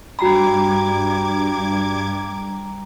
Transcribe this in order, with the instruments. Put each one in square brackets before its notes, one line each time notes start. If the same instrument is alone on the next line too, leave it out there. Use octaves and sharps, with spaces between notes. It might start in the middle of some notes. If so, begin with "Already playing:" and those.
[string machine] G2 D6 G#6 [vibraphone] G3 A#5 [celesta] F#4 B5